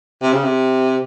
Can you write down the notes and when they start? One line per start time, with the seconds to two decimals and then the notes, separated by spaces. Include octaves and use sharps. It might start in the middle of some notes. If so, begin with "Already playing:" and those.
0.22 C3
0.33 C#3
0.43 C3